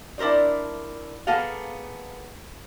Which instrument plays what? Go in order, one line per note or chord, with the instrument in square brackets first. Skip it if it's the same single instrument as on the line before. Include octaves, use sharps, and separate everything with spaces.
[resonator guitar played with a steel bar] D4 E4 A#4 C5 D5
A#3 B3 G#4 A4 F5